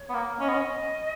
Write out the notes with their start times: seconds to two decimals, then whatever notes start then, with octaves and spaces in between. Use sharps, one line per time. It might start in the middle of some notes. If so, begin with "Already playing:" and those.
Already playing: C#5
0.09 B3
0.14 A#3
0.40 C#4 D#5
0.48 B3
0.53 C#4